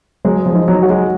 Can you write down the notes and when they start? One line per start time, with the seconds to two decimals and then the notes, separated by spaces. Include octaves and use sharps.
0.25 F#3 G#3
0.46 F3
0.53 D#4
0.68 F#3
0.82 F#4
0.89 G#3